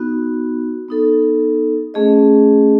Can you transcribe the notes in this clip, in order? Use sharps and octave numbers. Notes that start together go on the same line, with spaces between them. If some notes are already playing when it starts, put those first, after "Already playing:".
Already playing: B3 D#4 F#4
B3 D#4 A4
A3 C#4 G#4 D#5